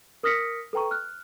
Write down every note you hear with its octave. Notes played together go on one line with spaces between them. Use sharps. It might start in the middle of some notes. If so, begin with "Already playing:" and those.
A#4 D#6 F6 A#6 B6 C#7
A4 B4 G5 A#5 C#6
F6 F#6